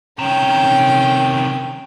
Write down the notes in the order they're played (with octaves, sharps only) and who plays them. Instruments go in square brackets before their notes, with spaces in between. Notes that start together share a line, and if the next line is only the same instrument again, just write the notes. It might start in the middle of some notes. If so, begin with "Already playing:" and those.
[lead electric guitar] C3 D#3 [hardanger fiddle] C#4 G5